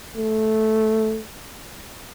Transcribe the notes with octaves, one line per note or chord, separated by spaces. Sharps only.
A3